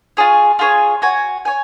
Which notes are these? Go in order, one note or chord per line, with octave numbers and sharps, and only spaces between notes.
F4 G#4 C#5
F4 G#4 C#5
F#4 C#5 G#5
C#5 G#5